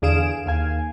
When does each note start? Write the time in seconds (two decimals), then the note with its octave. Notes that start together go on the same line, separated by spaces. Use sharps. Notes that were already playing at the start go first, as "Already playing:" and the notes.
0.02 E2 D3 G#4 F5 D7 E7
0.46 D#2 F5 G#5